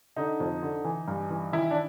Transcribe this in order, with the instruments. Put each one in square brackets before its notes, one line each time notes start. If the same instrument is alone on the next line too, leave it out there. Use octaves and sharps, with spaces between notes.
[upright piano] D3 D#4
F2
D3
E3
G2
E3
D#3 E4
D4